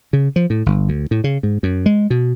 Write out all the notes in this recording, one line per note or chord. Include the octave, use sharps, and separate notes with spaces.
C#3
F3
A2
G1
D2
A2
C#3
G#2
F#2
G#3
B2